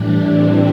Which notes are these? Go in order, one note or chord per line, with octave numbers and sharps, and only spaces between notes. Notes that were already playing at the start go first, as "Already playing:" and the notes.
Already playing: A2 E3 G3 D4
C4